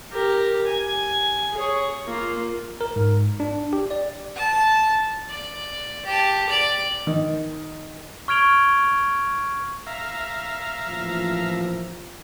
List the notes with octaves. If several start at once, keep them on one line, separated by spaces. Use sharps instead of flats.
G4 A#4
G#5
G#4 C#5
A#3 F4
A#4
G#2
D4
G4
D5
A5
D5
G4 A5
D5
D#3
C#6 F6 G#6 D7 F7 G7
E5 F5 A#5
A1 A#2 F3